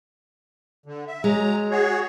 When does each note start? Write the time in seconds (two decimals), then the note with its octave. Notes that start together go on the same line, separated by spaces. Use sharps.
0.86 D3
1.07 E5
1.24 F#3 G#3 A#5
1.71 F#4 G#4 C#5